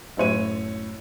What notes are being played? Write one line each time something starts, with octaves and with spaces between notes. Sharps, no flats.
F#2 A2 C#5 D#7